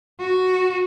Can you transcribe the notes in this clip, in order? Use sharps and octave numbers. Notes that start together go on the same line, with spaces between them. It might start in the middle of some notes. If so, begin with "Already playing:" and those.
F#4